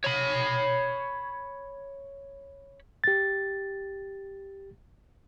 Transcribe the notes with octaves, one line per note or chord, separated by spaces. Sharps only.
C#5 B5
G4 A6